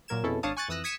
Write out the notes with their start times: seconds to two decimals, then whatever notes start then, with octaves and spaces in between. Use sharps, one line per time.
0.08 A#2 F#3 A#4 G#6 E7
0.23 F2 B2 C#4 E4 G#4 A4
0.43 G#1 D4 C#5 F5 A5 D#6
0.57 G#5 C#6 F#6 G#6 A6
0.68 F2 E3 D#6 E6 F#6 A#6
0.84 D#6 G#6 B6 C#7 D#7 E7